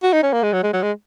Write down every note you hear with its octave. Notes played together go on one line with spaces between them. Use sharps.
F#4
D#4
C#4
A#3
G#3
F#3
G#3
F#3
G#3